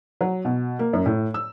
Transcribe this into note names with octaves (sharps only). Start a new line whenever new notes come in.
F#3
B2
A#3
F#2
A2
E6